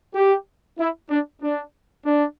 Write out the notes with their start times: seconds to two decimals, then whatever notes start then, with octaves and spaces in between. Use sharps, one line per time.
0.15 G4
0.79 E4
1.10 D4
1.42 D4
2.06 D4